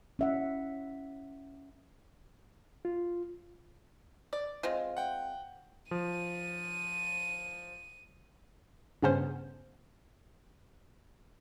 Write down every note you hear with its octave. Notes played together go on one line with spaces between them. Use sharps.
C#4 E5 F#5
F4
D5
G#3 C4 F4
F#5 G5
F3 D#7
G2 C#3 B3 C#4 C5